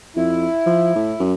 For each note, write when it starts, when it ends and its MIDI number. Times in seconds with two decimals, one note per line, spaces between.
0.16 0.47 41
0.16 1.22 64
0.66 0.94 53
0.96 1.14 45
1.20 1.34 42